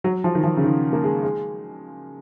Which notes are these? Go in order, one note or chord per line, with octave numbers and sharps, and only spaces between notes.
F#3
F3
D#3
F3
C#3
D#3
A#3
G#3
G#3